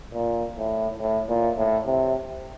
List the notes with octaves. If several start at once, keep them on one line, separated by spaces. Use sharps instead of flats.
A#2
A2
A2
A#2
A2
C3